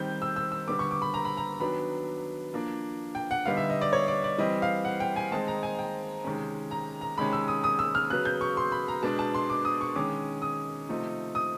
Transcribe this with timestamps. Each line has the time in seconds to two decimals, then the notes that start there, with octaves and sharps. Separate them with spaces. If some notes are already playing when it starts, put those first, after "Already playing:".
Already playing: D#3 G3 C4 G6
0.22 E6
0.36 E6
0.52 E6
0.68 D3 G3 B3 D6
0.79 C#6
0.91 D6
1.02 B5
1.14 A#5
1.25 B5
1.37 A#5
1.60 D#3 F#3 B3 D4 B5
2.53 F3 A#3 D4
3.15 G5
3.31 F#5
3.46 D3 G3 B3 D#4 F5
3.57 E5
3.70 D#5
3.81 D5
3.93 C#5
4.08 D5
4.24 D5
4.38 E3 G3 C4 D#5
4.62 F5
4.85 F#5
5.00 G5
5.16 G#5
5.31 D#3 G#3 C4 D#4 A5
5.48 A#5
5.63 G#5
5.79 G5
6.24 C3 D#3 G#3 C#4
6.71 A#5
7.01 A#5
7.18 C3 D#3 G#3 C#4 B5
7.33 E6
7.48 D#6
7.64 D#6
7.79 E6
7.95 F6
8.10 C#3 F#3 B3 F#6
8.25 G6
8.41 C#6
8.57 C6
8.72 B5
8.88 A#5
9.03 B2 G#3 B3 D4 A5
9.19 A5
9.35 C6
9.50 D6
9.65 D#6
9.81 C#6
9.96 D#3 G#3 C#4 D6
10.42 D#6
10.89 C3 F3 A3 C4 D#4
11.35 D#6